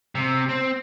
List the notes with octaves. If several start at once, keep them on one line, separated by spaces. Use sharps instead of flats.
C3
C4